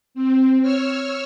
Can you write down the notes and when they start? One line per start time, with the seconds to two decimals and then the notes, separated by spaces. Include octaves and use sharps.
0.15 C4
0.62 C#5 E6 F6